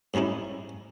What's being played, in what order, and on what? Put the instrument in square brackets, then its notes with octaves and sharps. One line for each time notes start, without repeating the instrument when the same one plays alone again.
[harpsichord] G#2 G3 C#4 D#4 E4